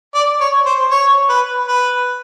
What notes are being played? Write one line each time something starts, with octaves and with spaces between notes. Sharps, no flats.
D5
C#5
C5
C#5
B4
B4